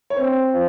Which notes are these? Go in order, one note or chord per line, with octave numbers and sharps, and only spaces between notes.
C#5
C4 C5
F3